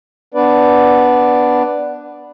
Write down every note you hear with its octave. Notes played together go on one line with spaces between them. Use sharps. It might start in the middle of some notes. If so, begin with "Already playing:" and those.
B3 D4 B4 D5